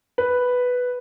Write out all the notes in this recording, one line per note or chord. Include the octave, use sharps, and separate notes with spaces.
B4